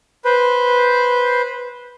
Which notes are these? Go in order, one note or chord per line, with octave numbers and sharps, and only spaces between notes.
B4 C5